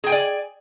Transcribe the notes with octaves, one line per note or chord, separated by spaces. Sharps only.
G#4 D5 G5 G#5